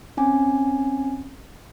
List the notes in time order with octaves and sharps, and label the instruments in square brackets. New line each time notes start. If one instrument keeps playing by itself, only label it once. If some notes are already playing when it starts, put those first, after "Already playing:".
[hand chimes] C4 C#4 G#5